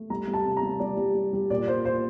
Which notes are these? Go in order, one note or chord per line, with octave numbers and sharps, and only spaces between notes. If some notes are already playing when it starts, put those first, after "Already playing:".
Already playing: A3
G3 A#5
G3
A5
C3
A#5
G3
G3 D5
G3
G3
G3
A#2 D5
A#2 C5
A#2 C5